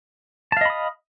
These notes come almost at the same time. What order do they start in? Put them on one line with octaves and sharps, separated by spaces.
A5 F5 D#5 B5 D#6